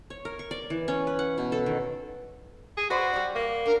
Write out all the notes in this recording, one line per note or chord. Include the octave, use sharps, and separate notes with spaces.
C#5
A#4
C#6
D5
E3
C#4
B4
F#5
B2
A4
D#3
G#4
F#4 B4 C5 D5
G3 D5
A#3
D4 A#4